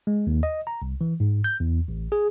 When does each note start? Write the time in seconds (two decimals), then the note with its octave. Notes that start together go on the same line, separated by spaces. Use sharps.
0.07 G#3
0.27 D#2
0.43 D#5
0.67 A#5
0.82 C2
1.01 E3
1.20 G#2
1.44 G6
1.60 E2
1.88 A1
2.12 G#4